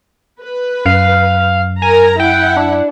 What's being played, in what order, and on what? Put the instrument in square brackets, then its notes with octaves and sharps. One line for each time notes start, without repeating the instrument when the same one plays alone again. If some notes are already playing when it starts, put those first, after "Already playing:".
[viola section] B4
[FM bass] F#2 [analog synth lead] F5
[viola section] A#4 A#5 [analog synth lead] G#5
[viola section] E4 F#5 [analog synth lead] G5
[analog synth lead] D4